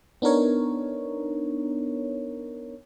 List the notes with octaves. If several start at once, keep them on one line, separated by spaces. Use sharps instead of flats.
B3 D4 D#4 A#4 C#5